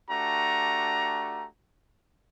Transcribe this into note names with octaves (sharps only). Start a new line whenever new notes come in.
A3 D4 F#4 G4 A#5